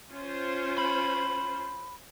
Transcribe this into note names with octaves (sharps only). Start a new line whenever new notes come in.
C#4 F4 C5
B5